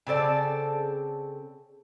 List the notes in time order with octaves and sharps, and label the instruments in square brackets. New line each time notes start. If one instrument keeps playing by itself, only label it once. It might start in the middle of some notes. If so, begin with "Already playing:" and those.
[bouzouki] C#3 C4 A4 D5